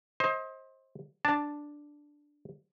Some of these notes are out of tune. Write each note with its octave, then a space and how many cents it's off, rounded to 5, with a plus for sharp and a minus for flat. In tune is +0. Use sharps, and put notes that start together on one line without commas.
C5 +25 D#5 +35
D4 +0 A5 +0